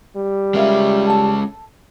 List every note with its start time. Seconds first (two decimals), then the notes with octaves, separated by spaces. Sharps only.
0.16 G3
0.54 G#3 C#4 A#4 E5 F5
1.06 A4 A5